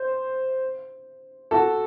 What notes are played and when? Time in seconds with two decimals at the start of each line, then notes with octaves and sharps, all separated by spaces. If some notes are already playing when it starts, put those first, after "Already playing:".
Already playing: C5
1.51 F#4 A4